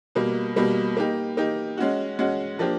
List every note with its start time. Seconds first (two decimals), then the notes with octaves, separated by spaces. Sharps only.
0.15 B2 G3 A#3
0.56 B2 G3 A#3
0.97 A#3 D#4 G4
1.37 A#3 D#4 G4
1.77 G#3 C#4 F#4
2.19 G#3 C#4 F#4
2.59 F3 A#3 D4 G4